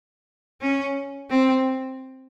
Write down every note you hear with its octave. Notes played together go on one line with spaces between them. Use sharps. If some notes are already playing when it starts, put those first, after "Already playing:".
C#4
C4